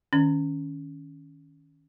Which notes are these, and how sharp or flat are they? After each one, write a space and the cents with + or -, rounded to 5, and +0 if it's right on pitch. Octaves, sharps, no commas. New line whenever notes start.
D#3 +0 C#4 +10